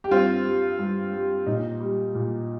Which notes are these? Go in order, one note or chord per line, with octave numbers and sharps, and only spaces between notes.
G4
G2 C4 F4
G3
G2
G3
A#2 D#4
G3
A#2